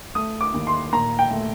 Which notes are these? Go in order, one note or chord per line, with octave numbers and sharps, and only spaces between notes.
A3 D#6
D6
D#2
C6
A#2 A#5
G5
A3